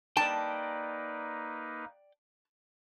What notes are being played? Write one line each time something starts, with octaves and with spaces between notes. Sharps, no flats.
A#3 D#4 B4 D5 G5 A5